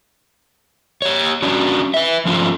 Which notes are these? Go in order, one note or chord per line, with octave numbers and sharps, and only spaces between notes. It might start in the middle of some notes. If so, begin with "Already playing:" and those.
G4 C#5
C#4 D4 F#4
B4 E5
F3 A3 C#4 F4